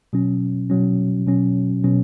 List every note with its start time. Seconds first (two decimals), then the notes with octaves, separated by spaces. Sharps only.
0.13 B2 F#3 C#4
0.70 B2 F#3 C#4
1.27 B2 F#3 C#4
1.84 B2 F#3 C#4